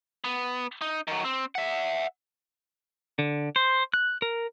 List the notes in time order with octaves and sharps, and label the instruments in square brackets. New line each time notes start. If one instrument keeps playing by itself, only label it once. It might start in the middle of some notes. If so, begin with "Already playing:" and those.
[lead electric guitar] B3
D#4
D#3 F#3
C4
E5 F#5
[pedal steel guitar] D3
C5
F#6
A#4